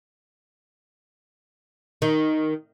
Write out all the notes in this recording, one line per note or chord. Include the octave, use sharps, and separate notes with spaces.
D#3